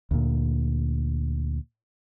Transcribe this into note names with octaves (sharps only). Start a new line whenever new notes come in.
D2 A#2